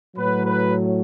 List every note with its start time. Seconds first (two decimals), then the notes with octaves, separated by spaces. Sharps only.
0.15 A2 F#3 B4
0.46 B4